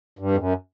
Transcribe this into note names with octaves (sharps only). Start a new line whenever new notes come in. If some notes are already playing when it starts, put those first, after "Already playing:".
G2
F2
F#2